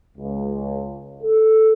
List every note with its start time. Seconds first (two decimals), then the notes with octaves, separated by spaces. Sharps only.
0.18 C#2
1.22 A4